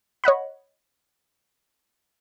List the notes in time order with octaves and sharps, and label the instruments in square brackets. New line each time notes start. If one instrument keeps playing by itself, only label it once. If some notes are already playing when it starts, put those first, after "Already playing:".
[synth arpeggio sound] C#5 D#5 F#5 B5